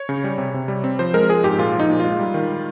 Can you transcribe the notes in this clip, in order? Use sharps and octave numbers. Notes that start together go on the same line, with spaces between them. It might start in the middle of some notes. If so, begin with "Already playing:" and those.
Already playing: C#5
C#3
G3
C3
C3
G3
C4
F3 C5
G#3 A#4
F3 G#4
G#2 G4
A#2 F4
F3
D#4
A#2
G#3 F4
G3
D#3